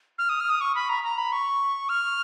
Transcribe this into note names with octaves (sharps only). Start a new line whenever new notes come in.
F6
D#6
F6
D#6
C#6
B5
A#5
A#5
B5
C#6
F6